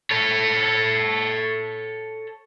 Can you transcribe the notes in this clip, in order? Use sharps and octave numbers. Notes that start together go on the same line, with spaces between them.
A4 C#5